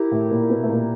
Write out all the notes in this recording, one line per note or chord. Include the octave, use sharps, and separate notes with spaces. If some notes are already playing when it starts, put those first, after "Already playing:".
Already playing: E4 G4 A#4
A2 A3
A#2 A#3
B2 B3
A3
A#2 A#3